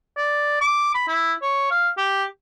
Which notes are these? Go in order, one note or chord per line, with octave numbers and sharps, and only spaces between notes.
D5
D6
B5
E4
C#5
F5
G4